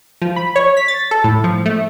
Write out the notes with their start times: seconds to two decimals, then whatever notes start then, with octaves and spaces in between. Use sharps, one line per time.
0.22 F3
0.36 B5
0.56 C#5
0.77 B6
0.88 A6
1.11 A4
1.24 A2
1.44 F3
1.66 A3